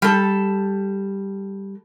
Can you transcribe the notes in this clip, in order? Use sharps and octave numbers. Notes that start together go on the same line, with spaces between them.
G3 A4